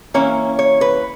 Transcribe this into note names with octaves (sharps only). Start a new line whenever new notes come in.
E3 A#3 C#4 C#5
C#5
B4